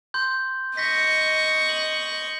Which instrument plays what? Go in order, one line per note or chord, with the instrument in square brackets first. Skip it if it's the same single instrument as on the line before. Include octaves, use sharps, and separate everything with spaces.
[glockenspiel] C6 G6
[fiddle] D#5 C#6 [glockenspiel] G6 A#6 B6
[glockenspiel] F#7